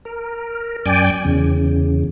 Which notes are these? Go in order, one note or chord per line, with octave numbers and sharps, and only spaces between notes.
A#4
F#2 D5 G5 G#5
E2 C#3